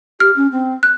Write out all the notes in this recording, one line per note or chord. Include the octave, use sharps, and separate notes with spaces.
G4 F6
C#4
C4
F#6